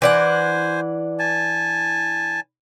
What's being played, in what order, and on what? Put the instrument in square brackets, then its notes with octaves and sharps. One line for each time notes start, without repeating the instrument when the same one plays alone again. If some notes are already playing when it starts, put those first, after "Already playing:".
[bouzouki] E3 D4 F#5 [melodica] C5 G#5
[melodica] G#5 A5